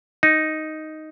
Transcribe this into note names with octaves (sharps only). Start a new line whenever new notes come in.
D#4